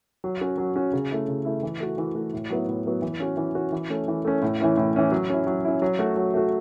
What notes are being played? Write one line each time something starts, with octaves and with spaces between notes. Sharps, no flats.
F#3
C#4 F#4
F#3
C#4 F#4
C#3
A3 E4
C#3
A3 E4
E3
A3 F#4
E3
A3 F#4
A2
F#3 B3 E4
A2
F#3 B3 E4
E3
C#4 F#4
E3
C#4 F#4
E3
A3 C#4
E3
A3 C#4
A2
E3 C#4 E4
A2
E3 C#4 E4
F#3
C#4 E4
F#3
C#4 E4
F#3
A3 F#4
F#3
A3 F#4